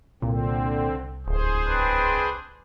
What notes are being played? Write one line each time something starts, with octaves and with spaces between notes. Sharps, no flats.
C2 A#2 D3 C4
D1 G#4 C5
C4 D4 B4